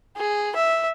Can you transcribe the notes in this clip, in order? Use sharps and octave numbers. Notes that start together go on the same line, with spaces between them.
G#4
E5